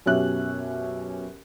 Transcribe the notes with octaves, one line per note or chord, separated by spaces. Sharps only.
F#2 B2 C#4 G4 E5 F#6